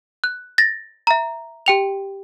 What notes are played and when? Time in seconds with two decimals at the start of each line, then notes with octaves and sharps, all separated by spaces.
0.24 F#6
0.58 A6 A#6
1.07 E5 A#5
1.66 G4 G5 F7